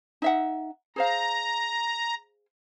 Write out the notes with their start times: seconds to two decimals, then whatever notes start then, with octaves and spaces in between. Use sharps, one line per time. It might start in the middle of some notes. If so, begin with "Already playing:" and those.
0.22 D#4 E5 F#5
0.96 G#4 C5 F5 A#5